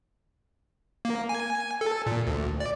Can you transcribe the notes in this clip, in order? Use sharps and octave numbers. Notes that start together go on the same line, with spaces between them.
A#3
G#5
A4
A#2
D2
D5